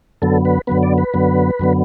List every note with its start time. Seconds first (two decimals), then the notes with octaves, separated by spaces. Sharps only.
0.22 F#2 D3 F#3 B3 A4
0.45 B4
0.67 F#2 D3 F#3 B3 B4
0.83 D5
0.98 B4
1.14 F#2 D3 F#3 B3
1.59 F#2 D3 F#3 B3